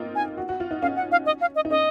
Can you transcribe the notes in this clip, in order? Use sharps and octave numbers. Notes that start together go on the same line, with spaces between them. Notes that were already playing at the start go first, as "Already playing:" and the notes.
Already playing: A#3 C4 D#4 F4
G#5
F#4
F#4
F4
D#4
C#4 F5
F#5
F5
D#5
F5
D#5
D#4
C#4 D#5